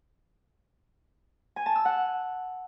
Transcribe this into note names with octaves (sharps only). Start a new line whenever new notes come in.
G#5
A5
E6
F#5